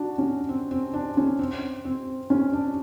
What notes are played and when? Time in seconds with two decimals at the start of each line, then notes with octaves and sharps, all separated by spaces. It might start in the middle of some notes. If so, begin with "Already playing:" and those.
Already playing: D4 F#4
0.18 C#4
0.49 C4
0.71 C4
0.94 D4
1.17 C#4
1.39 C4
1.85 C4
2.30 C#4
2.53 D4